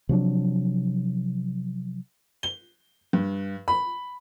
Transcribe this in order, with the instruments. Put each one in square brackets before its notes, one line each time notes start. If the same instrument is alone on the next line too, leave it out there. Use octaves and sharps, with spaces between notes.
[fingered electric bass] C3 F3 F#3 D4
[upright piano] G7
G2
B5